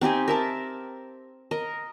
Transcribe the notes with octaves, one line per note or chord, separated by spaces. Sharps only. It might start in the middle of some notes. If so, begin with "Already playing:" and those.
C4 D#4 G4 G#5
A#4 E5 A5
A#4 D#5